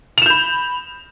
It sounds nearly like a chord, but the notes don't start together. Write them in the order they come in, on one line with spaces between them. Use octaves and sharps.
F7 E7 G6 B5